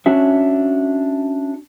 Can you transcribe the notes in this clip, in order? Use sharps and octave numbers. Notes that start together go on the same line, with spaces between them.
C#4 D4 F#4 E5